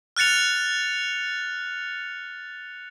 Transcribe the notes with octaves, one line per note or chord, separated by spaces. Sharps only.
F6 F#6 A6 C#7 F7